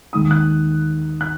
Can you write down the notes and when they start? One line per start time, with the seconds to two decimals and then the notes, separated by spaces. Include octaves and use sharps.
0.13 D#2 D#3 G#3 D#4 D#6
0.31 F#6
1.21 F#6